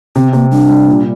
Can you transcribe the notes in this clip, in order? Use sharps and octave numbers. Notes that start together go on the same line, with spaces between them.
C3 C4
C3 A#3
G3 D4
G3
A#2